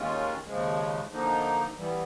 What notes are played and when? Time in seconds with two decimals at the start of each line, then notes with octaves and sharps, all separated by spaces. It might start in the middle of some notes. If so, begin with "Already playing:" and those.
Already playing: D#2 D#3 G#3 C#4 F4
0.46 D#2 C#3 F3 G#3
1.11 D3 F3 A#3 D#4
1.76 E3 G3 B3